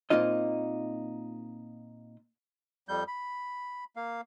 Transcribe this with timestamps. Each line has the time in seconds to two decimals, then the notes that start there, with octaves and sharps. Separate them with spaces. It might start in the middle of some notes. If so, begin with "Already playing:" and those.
0.10 A#2 A#3 C4 D#4 F4 D#5
2.89 F2 G3 G6
3.08 B5
3.96 A#3 F5